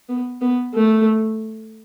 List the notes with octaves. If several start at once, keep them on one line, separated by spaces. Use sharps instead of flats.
B3
B3
A3